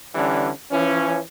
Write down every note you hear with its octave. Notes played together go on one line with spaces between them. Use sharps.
D3 E3 G3 C#4
E3 F3 C#4